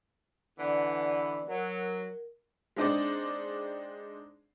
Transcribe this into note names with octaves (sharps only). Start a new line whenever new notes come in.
D3 E3 B3 D5
F#3 A#4
G#3 C4 D4 D#4 C5 D5